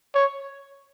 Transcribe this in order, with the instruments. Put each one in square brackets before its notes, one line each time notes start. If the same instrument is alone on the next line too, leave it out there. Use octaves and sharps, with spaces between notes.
[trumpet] C#5